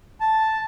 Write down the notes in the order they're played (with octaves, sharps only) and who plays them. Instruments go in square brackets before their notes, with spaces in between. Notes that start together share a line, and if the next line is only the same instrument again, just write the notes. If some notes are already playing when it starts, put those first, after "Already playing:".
[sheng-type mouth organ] A5